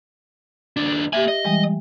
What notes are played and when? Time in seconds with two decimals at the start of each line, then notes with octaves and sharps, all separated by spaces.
0.77 D#2 D4
1.13 A#3 G4 E5 G#5
1.28 D#5
1.45 E3 G3 G#3